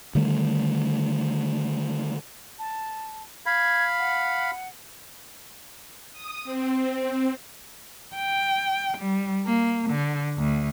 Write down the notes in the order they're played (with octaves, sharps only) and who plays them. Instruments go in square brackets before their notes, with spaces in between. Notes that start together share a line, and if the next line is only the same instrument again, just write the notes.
[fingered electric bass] D3 D#3 G3 A3
[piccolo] A5
[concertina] F5 B5 [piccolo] G#6
[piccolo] F#5
[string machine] D#6
C4
[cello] G5
G3
A#3
D3
D2